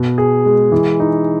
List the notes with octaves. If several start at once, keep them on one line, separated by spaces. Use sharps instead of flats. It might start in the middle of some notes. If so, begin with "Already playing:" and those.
Already playing: B2
G#4
G#3
E3
D#4